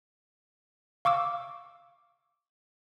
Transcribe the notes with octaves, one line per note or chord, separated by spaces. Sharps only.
F5 C#6 D6 E6